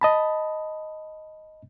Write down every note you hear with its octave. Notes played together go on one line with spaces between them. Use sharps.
D#5 A5 B5